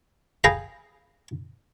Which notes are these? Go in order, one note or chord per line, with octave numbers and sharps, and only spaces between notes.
G#4 F5 G5 A#5 B5